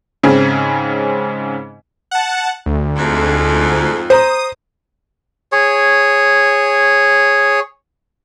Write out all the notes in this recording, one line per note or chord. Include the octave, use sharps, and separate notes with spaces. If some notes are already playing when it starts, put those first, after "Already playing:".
G#2 C#3 C4 C#4 G#4
F#5 A5
D2
F2 G#2
C5 A#5 D#6
G#4 C#5